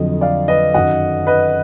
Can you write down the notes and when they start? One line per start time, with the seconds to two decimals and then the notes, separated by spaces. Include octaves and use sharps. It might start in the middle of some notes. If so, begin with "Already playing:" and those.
Already playing: F2 D3 F#3 D#5
0.21 D5 F5
0.48 B4 D#5
0.74 F#2 D#3 F#3 D#5 F#5
1.27 B4 D#5